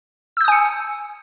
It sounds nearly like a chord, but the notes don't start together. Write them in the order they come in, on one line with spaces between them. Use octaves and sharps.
E6 G6 D#6 G#5 C#7